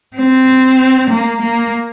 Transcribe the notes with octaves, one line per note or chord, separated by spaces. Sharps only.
C4
A#3
A#3